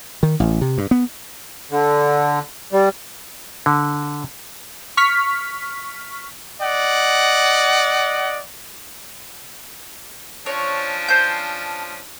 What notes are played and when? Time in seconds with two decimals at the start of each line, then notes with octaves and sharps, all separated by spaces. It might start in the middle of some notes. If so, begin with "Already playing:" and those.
0.23 D#3
0.40 A1
0.61 C3
0.78 G2
0.91 B3
1.71 D3
2.73 G3
3.66 D3
4.97 C#6 F6 B6
6.62 D5 D#5 F#5
10.46 F3 C#4 D4 C#5
11.09 C5 A5 G6